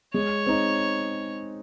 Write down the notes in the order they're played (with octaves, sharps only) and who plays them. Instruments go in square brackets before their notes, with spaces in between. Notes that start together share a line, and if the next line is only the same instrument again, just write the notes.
[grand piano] G#3 [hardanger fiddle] C#5
[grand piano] C4 D#4